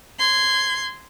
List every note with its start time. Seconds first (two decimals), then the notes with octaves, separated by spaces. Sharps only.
0.19 C6 G#6